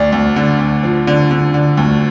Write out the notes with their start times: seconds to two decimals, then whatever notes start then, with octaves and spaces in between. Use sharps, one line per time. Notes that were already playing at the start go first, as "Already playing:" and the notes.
Already playing: D2 D5
0.12 D2
0.36 D3
0.59 D2
0.83 F3
1.07 D3
1.31 D3
1.54 D3
1.77 D2